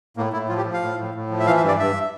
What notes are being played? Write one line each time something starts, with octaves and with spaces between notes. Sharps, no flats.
A2 A#3
A2 E4
F3 F4
G4
F3
F5
A2
A2
A2
F3
E5
E3 F5
E5
G2
D5
G2 E5